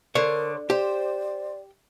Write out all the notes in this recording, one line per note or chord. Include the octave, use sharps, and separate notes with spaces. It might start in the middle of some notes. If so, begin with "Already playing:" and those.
D3 A#4 C5 C#5
G4 C5 D5